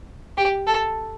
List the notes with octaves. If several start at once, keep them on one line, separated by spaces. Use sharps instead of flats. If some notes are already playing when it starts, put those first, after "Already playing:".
G4
A4